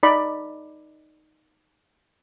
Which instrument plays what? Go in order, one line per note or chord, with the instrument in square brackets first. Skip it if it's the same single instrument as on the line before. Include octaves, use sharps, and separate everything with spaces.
[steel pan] D#4 D5 B5